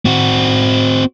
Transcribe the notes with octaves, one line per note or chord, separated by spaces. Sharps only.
C4 F#4